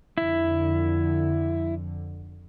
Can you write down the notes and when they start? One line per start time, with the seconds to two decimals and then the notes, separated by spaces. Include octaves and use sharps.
0.18 F2 D3 E4